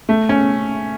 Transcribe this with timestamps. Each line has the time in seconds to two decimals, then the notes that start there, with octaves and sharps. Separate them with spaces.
0.09 A3
0.29 C#4